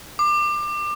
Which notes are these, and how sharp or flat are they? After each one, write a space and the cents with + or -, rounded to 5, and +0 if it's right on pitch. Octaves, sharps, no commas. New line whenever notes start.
D6 +25